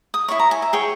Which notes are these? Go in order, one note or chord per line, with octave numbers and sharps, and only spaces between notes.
D#6
E4 G#4 C#5 C#6
A#5
G#5
E5
G#4 C#5 G5